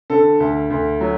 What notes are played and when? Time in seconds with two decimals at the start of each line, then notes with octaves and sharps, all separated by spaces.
0.10 D3 A4
0.40 D2
0.70 D2
1.01 F#3